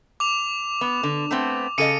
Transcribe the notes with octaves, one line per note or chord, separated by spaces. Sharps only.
D6 F7
B3
D3
A3 B3 C4
C#3 A4 D#5 C#7 D#7